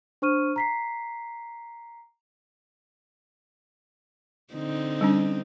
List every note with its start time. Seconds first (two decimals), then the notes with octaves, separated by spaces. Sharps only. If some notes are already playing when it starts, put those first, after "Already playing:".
0.22 D4 C5 C#6 F6 D#7
0.56 A#5 B6 C7
4.54 D3 C4 D#4
5.01 G3 C#4 D4